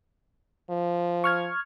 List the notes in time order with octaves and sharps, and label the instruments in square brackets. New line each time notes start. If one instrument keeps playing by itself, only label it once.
[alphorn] F3
[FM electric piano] C#6 F6 G#6